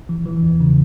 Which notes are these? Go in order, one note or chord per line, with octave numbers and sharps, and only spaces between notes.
E3
E3
E2
C#3